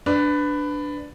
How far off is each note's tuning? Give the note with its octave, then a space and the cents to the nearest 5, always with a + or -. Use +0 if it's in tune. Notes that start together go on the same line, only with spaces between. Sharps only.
D4 +0 B4 +15